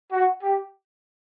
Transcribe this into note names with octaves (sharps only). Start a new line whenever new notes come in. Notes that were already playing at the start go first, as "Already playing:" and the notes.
F#4
G4